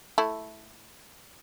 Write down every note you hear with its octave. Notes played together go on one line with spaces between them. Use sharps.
A3 E4